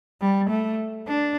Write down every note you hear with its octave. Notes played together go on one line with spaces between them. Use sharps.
G3
A3
D4